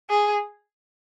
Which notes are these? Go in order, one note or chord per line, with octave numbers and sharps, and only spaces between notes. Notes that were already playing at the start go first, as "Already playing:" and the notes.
G#4